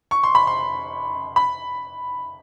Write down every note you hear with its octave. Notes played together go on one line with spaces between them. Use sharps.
C#6
C6
B5
C6
B5